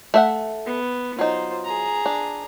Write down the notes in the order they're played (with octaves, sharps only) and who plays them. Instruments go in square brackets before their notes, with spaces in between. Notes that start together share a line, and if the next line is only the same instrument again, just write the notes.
[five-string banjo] A3 E5 F#5
[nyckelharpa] B3
[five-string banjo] F#3 D#4 [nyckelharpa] F4 C5
[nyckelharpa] G#4 A#5
[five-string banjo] D4